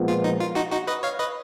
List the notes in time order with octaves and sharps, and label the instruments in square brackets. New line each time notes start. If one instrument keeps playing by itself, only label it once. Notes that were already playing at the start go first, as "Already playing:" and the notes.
Already playing: [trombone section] A#2 F3 G#3 B3
[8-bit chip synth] F4
D#4
F4
D#4 F#4
D#4 F#4
B4 D#5
C#5 F5
B4 D#5